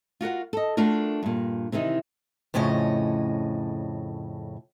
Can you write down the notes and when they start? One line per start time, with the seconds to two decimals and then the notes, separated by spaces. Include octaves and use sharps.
0.21 F4 F#4 A#4 F#5
0.53 A4 D#5
0.77 A3 D4 F4 F#4 A#4
1.23 G2 A#2
1.72 C3 D#3 E3 D#4
2.54 F2 A2 C#3 C#4 D#5